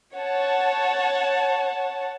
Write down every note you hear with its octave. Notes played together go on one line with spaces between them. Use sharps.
C#5 F#5 A5